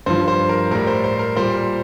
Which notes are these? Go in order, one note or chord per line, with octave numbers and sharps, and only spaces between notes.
G2 F3 C5
C5
A#4
A2 G3 A#4
C5
C5
A#4
A#2 G3 C5